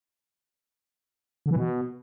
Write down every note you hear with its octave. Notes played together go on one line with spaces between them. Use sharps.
D3
E3
B2